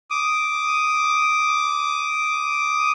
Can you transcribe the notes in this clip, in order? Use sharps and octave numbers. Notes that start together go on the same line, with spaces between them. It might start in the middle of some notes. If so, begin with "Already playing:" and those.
D6 D#6